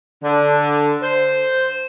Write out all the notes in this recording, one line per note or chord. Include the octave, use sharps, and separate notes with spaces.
D3
C5